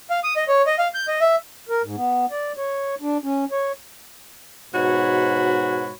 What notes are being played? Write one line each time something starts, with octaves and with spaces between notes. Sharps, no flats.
F5
D#6
D#5
C#5
D#5
F5
G6
D#5
E5
A#4
G#2
B3
D5
C#5
D4
C#4
C#5
G#2 B2 F#4 C#5 B5